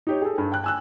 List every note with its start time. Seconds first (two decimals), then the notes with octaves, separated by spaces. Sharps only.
0.07 D#4 G4 C#5
0.22 G#4 A4
0.38 G2
0.52 G5 F#6
0.64 G#5 E6 F#6